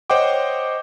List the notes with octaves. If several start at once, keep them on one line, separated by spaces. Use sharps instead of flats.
C5 C#5 D#5 F#5 G5 D6